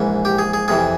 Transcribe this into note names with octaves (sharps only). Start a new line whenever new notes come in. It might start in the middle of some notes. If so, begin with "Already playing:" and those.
Already playing: A#1 G#2 E3
G4
G#4
G#4
F2 C3 E3 G#4